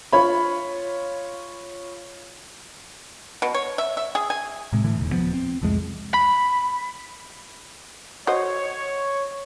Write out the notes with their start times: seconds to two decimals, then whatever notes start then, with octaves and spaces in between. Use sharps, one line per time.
0.13 F4 C#5 B5
3.42 B2
3.54 C#5
3.78 E5
3.97 E5
4.15 G#4
4.30 G#5
4.73 A2 C3 G#3
4.84 A2 D3 E3 A3
4.98 E1 D#2
5.12 D#1 F3 B3
5.34 C4
5.62 C2 F2 A2 G#3
6.14 B5
8.27 F#4 C5 C#5 D#5